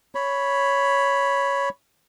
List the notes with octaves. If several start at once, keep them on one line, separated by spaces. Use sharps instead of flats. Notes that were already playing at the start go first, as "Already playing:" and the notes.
C#5 B5